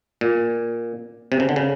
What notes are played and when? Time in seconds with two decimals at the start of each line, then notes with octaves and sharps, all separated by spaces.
0.21 A#2
1.32 C3
1.40 C#3
1.49 D3
1.56 C#3